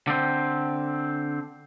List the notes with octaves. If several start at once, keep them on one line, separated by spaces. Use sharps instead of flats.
D3 C4